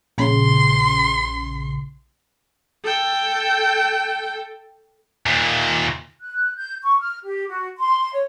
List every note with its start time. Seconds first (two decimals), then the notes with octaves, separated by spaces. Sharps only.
0.18 A#1 C#3 C6
2.84 A4 G5
5.26 D#2 A#2
6.21 F#6
6.57 G6
6.83 C#6
7.00 F6
7.25 G4
7.49 F#4
7.79 C6
8.13 C#5